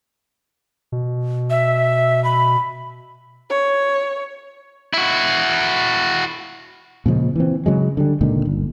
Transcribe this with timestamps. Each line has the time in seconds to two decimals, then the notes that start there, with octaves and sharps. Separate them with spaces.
0.92 B2
1.50 E5
2.24 B5
3.50 C#5
4.94 E4 F#4
7.06 A#2 C#3 F3 G#3
7.36 E3 C4
7.66 C#3 F#3 G#3
7.97 D3 G3
8.21 C#2 A#2 D3 D#3
8.45 G1